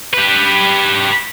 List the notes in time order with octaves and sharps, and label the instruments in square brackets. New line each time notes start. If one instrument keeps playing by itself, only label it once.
[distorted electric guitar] G4 B4